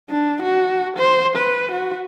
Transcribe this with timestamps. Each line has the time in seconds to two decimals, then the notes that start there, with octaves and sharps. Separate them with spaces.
0.10 D4
0.42 F#4
0.97 C5
1.37 B4
1.72 F#4